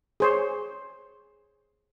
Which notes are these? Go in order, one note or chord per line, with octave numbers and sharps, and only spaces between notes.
G#4 C5 C#5